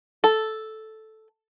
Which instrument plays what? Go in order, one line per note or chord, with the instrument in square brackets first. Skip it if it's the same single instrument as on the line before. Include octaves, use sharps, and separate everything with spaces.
[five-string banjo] A4